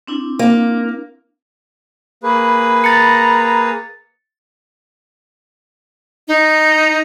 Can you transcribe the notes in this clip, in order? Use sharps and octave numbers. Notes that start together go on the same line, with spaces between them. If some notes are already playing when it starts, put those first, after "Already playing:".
C4 D4 E4
A#3
A#3 G#4 B4 B5
A#5 A6 C#7
D#4